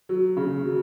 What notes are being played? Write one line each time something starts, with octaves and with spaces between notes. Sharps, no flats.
F#3
C#3
F#3